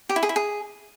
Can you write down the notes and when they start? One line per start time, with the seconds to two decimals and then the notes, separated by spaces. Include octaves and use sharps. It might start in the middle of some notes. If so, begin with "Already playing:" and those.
0.09 G4
0.16 E4
0.23 G#4
0.29 E4
0.36 G#4